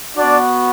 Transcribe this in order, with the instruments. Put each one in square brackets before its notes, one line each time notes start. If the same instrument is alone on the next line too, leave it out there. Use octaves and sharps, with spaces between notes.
[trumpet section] B3 D4 F#4 D5